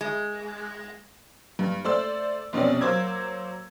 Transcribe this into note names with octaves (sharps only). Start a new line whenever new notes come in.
G#3
G2
A3 C5 D5 C6 E6
F1 B2 C4 C#4 D5
F#3 A#3 C5 D6 E6 G#6